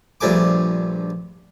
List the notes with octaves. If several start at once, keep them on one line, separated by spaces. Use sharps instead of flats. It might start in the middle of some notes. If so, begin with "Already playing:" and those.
A#1 G2 F3 A3 G#5 D6